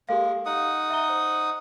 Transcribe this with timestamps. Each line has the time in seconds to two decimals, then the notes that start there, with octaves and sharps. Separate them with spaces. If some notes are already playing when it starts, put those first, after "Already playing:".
0.09 G#3 A#3 G4 A4 F5
0.46 D#4 F#5 D#6
0.90 E5 A#5 G7
1.09 C5